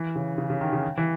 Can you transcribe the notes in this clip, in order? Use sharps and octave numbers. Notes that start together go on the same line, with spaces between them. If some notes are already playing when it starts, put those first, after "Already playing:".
Already playing: E3
C#3
C#3
C#3
D#3
C#3
E3